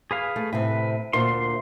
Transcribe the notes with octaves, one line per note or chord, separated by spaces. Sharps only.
G#4 B4 F5
A3
A2 C3 C4 B4
D2 A#2 C5 C6